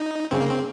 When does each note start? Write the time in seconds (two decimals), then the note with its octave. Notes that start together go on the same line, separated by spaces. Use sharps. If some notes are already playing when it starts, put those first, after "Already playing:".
Already playing: D#4
0.31 C#3 C4
0.41 A#3
0.50 C4